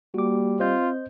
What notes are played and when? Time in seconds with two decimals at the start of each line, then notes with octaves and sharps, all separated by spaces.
0.14 G3 A#3 F#4 D6
0.60 C4 F4 C5 D#5 G6